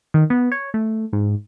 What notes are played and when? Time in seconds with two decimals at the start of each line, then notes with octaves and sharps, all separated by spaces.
0.14 D#3
0.30 B3
0.52 C#5
0.74 A3
1.13 G#2